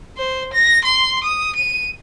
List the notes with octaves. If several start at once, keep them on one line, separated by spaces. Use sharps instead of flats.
C5
A#6
C6
D#6
D#7